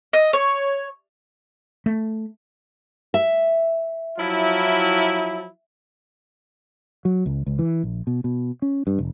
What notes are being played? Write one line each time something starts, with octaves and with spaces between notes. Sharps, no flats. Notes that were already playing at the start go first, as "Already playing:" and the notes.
D#5
C#5
A3
E5
F3 F#3 E4
F#3
C#2
C#2
E3
A#1
B2
B2
C#4
G2
F1